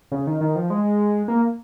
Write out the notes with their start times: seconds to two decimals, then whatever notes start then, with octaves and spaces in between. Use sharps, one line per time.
0.12 C#3
0.27 D#3
0.41 D#3
0.56 F3
0.70 G#3
1.28 A#3